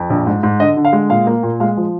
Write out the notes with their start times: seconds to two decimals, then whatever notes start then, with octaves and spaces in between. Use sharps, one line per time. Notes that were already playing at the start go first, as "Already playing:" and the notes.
Already playing: F2
0.10 A#1
0.26 G#2
0.43 G#2
0.59 D3 D#5
0.77 D3
0.85 F5
0.93 G#3
1.10 A#2 F5
1.27 A#3
1.43 A#2
1.60 G#3 F5
1.77 F3